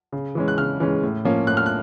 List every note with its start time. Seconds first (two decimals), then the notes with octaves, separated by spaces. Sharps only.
0.12 C#3
0.35 E3 G#3 C#4
0.48 F#6
0.57 C#3 F6
0.80 E3 G#3 C#4
1.03 A2
1.25 F3 A#3 C#4
1.47 A2 F#6
1.57 F6
1.66 F#6